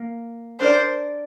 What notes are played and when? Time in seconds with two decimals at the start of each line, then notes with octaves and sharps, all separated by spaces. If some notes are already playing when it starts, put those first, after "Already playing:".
Already playing: A#3
0.60 D4 A#4 C5 D5